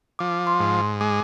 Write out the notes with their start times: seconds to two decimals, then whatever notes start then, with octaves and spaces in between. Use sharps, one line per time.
0.19 F3 D6
0.47 C6
0.59 G#2
1.01 G#3 D6